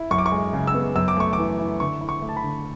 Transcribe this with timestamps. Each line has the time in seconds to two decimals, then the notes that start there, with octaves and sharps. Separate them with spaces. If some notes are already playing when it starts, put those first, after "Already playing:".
Already playing: E4
0.11 F#2 C#6
0.18 D6
0.26 C#6
0.32 G#3
0.53 C#3
0.67 E6
0.74 B3
0.96 F#2 E6
1.08 D6
1.17 A3 C#6
1.33 E3 D6
1.59 E4
1.80 D3 C#6
2.01 E4
2.09 C#6
2.22 A3
2.29 A5
2.37 B5
2.43 D3